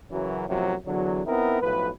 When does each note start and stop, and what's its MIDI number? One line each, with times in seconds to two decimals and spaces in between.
0.11 0.46 42
0.11 0.46 49
0.11 0.46 52
0.11 0.46 54
0.11 0.46 61
0.48 0.74 42
0.48 0.74 45
0.48 0.74 48
0.48 0.74 53
0.48 0.74 54
0.86 1.21 40
0.86 1.21 50
0.86 1.21 54
1.26 1.59 59
1.26 1.59 60
1.26 1.59 63
1.26 1.59 64
1.26 1.59 70
1.61 1.89 35
1.61 1.89 45
1.61 1.89 53
1.61 1.89 71